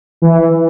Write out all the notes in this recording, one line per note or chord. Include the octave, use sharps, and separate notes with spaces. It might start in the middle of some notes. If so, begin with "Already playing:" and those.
E3